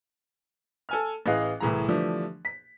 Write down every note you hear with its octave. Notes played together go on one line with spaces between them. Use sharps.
A4 G#5 F6
A1 E3 G#4 D#5 F5 F#6
C2 A2 E3 G#4 A#5
D3 E3 F3 G3 A3 D4
B6